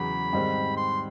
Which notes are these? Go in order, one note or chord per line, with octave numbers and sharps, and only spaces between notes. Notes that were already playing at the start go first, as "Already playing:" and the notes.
Already playing: E2 C#3 F#3 B5
G#2 D#3 G3 C4
C6